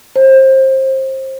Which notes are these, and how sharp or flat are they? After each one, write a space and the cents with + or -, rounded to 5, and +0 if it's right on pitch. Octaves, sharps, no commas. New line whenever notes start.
C5 +25